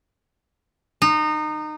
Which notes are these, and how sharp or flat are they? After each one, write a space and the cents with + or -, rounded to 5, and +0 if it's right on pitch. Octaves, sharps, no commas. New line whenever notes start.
D#4 -25